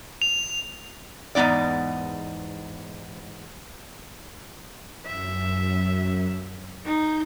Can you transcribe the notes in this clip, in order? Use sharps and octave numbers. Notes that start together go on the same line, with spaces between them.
F7
E2 G#2 B3 D#4 D5
F#2 E5
D#4 G6